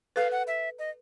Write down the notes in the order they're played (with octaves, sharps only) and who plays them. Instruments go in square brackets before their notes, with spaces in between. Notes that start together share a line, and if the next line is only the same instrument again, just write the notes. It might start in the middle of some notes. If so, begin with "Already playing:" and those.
[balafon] A4 B4 [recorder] F5
[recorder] F#5
E5
D#5